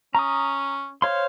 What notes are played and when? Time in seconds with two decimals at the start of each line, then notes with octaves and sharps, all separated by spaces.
0.15 C#4 A#5 D#6
1.02 C5 C#5 F5 C6